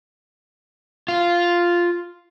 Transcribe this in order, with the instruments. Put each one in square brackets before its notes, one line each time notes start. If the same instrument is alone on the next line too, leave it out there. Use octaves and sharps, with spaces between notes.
[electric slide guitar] F4